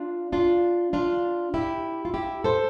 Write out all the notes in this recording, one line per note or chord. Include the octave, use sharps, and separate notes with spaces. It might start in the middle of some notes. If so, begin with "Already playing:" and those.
Already playing: D4 F4
D4 F4
D4 F4
E4 G4
F4
E4 G4
A4 C5